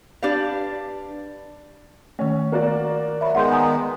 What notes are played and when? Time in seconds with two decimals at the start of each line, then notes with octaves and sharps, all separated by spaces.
0.22 D4 G4 B4 F5
2.19 D#3 A3 C#4
2.52 A#3 F#4 D5
3.21 F#3 E5 B5
3.35 D#3 G#3 B3 F#5 C6 G6
3.52 G#5 A#5 D#6